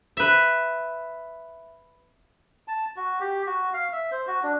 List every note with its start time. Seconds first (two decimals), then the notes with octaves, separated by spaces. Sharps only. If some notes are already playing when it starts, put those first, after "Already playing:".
0.17 B4 E5
2.68 A5
2.96 F#4
3.20 G4
3.47 F#4
3.74 F5
3.93 E5
4.11 C5
4.27 F#4
4.43 D4